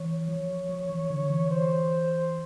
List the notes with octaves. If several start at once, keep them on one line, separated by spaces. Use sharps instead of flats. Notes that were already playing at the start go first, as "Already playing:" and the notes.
Already playing: E3 C#5
F3
F3
E3
D3
E3
C5